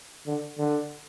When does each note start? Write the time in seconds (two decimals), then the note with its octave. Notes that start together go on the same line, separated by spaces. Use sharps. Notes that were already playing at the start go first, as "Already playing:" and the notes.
0.26 D3
0.58 D3